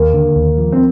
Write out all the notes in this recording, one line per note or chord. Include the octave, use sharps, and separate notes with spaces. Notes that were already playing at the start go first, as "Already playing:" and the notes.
Already playing: D#2 A#3
D3
D#2
F3
C4